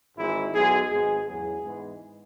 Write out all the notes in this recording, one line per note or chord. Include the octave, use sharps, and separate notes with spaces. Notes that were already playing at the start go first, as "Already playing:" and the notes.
G#1 G#2 E3 G#3 E4
B1 B2 G#3 B3 G#4
G#1 G#2 G#3 B3 G#4
E2 C#3 F#3 B3 G#4
G#2 E3 G#3 B3